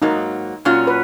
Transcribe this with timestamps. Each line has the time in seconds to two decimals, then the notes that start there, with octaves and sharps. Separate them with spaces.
0.02 G#2 F#3 A#3 D#4
0.65 A#2 F#3 C#4 F4
0.87 B4